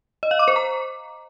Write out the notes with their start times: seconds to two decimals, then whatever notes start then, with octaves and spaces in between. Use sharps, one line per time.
0.23 D#5
0.31 F5
0.39 D6
0.48 C5
0.56 A#5